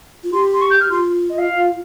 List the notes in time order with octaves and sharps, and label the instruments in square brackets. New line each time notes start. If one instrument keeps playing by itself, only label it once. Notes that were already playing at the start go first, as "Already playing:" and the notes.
[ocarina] F4
[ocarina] G4 [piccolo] C6
[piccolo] C6
C#6
G6
F6
[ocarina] F4 [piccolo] C6
[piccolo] D#5
F5